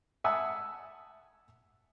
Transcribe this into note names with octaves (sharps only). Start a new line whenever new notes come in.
E5 F#5 G#5 A5 D#6 E6